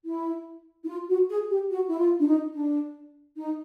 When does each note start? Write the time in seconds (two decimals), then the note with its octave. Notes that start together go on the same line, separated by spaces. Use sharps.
0.06 E4
0.84 E4
0.89 F4
1.09 F#4
1.30 G#4
1.50 G4
1.71 F#4
1.88 E4
1.98 F4
2.20 D4
2.27 D#4
2.54 D4
3.36 D#4